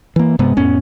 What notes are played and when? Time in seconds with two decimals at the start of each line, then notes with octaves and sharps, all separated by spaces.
0.16 E3 A#3
0.39 G2 C3 G#3 B3
0.57 F2 A2 B3 C#4